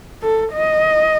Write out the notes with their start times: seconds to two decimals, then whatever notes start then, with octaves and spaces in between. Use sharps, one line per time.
0.22 A4
0.53 D#5